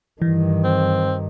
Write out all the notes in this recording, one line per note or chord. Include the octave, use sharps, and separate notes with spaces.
G2 D#3 E3
C4